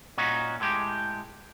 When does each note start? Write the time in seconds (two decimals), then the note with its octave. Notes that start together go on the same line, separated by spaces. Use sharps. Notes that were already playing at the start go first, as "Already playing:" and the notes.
0.18 A#2 C#4 D#4 F#4
0.60 A2 G#3 G4